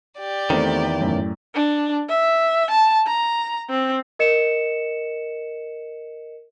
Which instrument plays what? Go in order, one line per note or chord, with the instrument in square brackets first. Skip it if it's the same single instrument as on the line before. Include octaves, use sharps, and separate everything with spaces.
[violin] G4 D5
[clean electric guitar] E2 D#3 [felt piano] A3 C4
[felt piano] F#2 A2
[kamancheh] D4
E5
A5
A#5
C4
[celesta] A#4 D#5 C#7 E7